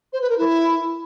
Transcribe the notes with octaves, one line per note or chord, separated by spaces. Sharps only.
C5
B4
A#4
E4